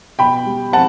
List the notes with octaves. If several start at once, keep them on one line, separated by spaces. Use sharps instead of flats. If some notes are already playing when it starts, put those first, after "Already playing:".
B2 G5 B5
G3
C4 F#5 A5